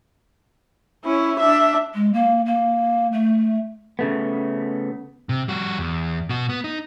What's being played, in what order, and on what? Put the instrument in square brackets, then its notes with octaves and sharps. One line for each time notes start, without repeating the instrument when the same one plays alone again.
[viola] C#4 E4
D4 E5
[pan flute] G#3
A#3
A#3
A3
[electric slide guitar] C#3 A3 B3
[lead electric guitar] C3
G3 F#4
E2
B2 F#4
B3
D#4